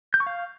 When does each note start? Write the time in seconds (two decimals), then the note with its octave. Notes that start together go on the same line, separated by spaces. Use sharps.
0.14 G6
0.20 C#6
0.27 F5